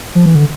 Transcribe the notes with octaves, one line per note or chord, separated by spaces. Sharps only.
F3
E3
D3